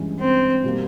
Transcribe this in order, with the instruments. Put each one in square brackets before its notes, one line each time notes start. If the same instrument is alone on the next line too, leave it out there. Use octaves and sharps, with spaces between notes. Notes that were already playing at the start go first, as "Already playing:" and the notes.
Already playing: [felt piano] G2 E3 G#3 C#4
[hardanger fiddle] C4
[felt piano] B2 G3 A#3